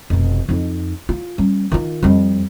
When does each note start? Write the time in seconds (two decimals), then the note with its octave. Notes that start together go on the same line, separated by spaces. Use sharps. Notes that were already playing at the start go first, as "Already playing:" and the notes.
0.10 F1 B2
0.49 F2 D#4
1.09 F4
1.38 G3 C#4
1.72 D#3 F4
2.03 F2 G3